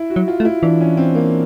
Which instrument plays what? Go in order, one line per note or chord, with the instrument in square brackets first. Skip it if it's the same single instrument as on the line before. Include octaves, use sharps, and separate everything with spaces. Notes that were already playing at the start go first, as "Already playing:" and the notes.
Already playing: [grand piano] E4
F#4
[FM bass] F#3
[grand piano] F4
[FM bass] A3
[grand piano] E4
[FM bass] E3 [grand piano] D4
[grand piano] C#4
C4
A#3